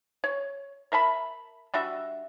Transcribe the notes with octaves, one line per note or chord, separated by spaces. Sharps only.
C#5
A#4 E5 A5 B5
G3 D4 F#4 E5